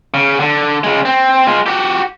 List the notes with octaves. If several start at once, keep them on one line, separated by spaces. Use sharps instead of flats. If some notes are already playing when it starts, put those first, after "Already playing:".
C#3
D3
C#3 G#3
C4
G#3 F4
F#4 G4